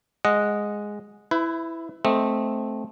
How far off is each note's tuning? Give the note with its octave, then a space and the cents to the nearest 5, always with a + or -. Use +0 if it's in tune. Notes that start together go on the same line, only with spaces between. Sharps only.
G#3 +0 D#5 +0 F#5 -10
E4 +0 B4 +30
A3 -10 C4 +0 D#5 +0